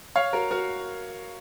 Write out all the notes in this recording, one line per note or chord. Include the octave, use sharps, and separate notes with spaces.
C#5 F5
F#4 A#4
F#4 A#4